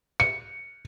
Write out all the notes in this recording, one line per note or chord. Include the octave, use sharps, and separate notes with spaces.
C#7